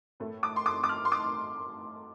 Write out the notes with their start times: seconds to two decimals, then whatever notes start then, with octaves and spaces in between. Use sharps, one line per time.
0.20 A2 A3
0.43 D6
0.56 C6
0.66 D6
0.84 D6
0.89 F6
1.05 C6
1.12 D6